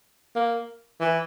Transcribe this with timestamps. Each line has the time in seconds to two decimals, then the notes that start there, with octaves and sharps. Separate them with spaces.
0.36 A#3
1.00 E3